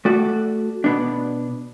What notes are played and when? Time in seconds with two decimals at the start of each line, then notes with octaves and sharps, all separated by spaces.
0.05 A3 F#4 D5
0.84 B2 B3 D4